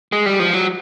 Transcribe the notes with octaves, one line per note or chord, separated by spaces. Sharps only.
G#3
G3
F3
F#3